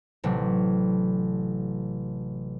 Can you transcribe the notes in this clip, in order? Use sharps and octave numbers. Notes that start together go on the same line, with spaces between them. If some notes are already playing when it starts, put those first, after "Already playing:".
A1 C3 F#3